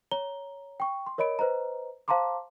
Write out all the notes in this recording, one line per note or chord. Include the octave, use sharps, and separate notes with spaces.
C#5 A#5 G7
G5 C#6
C6
A#4 C#5 D#5 B5 D7
B4 C5 D#5 A#5
C5 F5 A5 A#5 C6 D6